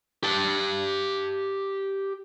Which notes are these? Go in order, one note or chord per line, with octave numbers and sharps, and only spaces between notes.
G4 A5